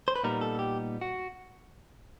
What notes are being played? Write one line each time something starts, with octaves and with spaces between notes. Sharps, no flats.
C5
B4
A#2 G3 B3 D#4 A#4
A4
G4
F#4